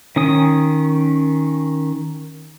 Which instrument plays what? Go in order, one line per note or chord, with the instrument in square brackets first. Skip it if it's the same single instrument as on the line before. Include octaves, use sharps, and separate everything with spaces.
[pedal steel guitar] D#3 C#4 D#6